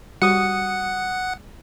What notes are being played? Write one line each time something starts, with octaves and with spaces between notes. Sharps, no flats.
G3 F#4 F#5 D#6 C#7